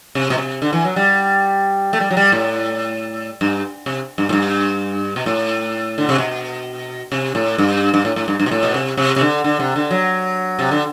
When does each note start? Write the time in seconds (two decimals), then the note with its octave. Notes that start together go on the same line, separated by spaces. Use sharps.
0.15 C3
0.30 B2
0.38 C3
0.62 D3
0.73 E3
0.85 F#3
0.96 G3
1.93 A3
2.00 G3
2.11 F#3
2.17 G3
2.32 A2
3.41 G2
3.86 C3
4.18 G2
4.29 A2
4.33 G2
5.16 B2
5.26 A2
5.98 D3
6.09 C3
6.18 B2
7.12 C3
7.35 A2
7.58 G2
7.94 G2
8.05 A2
8.16 A2
8.28 G2
8.40 G2
8.46 B2
8.51 A2
8.63 B2
8.74 C3
8.97 C3
9.16 C3
9.21 D3
9.44 D3
9.60 C3
9.76 D3
9.91 F#3
10.59 C3
10.71 D3